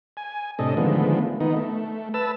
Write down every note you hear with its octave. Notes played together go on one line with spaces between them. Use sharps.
G#5
A2 C3 D4 A4 D#5
D3 D#3 F3 G#3 A3 B3
D#3 B3 D#4
A3
B4 A5 E6